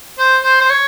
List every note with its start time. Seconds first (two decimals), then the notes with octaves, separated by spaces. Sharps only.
0.19 C5
0.44 C5
0.60 C5
0.70 C#5